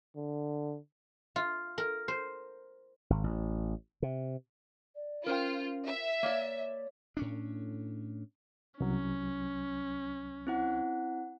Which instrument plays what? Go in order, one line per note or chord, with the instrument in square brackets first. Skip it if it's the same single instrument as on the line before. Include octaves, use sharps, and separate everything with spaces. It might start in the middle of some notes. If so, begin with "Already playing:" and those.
[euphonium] D3
[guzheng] F4
A#4
C5
[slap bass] G#1
A1
C3
[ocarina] D5
[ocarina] C#4 [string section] F4 [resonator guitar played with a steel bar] A#4 C5 G5
[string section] E5
[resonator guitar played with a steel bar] A#3 D5 [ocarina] C#5
[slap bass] A2 C#4 D4
[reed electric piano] C2 F#3 [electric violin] C#4
[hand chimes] C4 E4 F#5